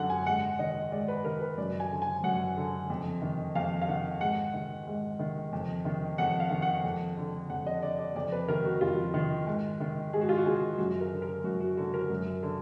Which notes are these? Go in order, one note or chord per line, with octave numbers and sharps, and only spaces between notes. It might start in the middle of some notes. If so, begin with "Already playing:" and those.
Already playing: F#2 D3 F#5
G#5
G#2 F#5
D#3 D#5
G#2 D5
B4
D#3 A#4
B4
F#2 D5
G#5
D3
G#5
F#2 F#5
D3
F2
D#3
F2 F5
F5
D#3 F#5
G#2 F#5
D#3
G#2
D#3
F2
D#3
F2 F#5
F5
D#3
F#5
F2
D3
F2 F#5
D#5
D3 D5
D5
F2 D5
B4
D#3 A#4
F#4
F2 F4
D#3
G#2
D#3
G#2 G#4
F#4
F4
F#4
D#3 G#4
F#2 F#4
A#4
D3
A#4
F#2 F#4
F#4
D3 F#4
A#4
F#2
D3